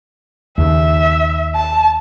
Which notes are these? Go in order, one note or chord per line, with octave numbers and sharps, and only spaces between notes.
D#2 C#3 E5
A5